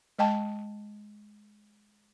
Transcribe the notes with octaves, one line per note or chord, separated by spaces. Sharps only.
G#3 D#5 G5 A5